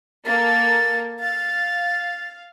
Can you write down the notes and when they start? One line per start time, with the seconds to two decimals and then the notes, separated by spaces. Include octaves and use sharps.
0.26 A#3 A4 A6
1.20 F5 A6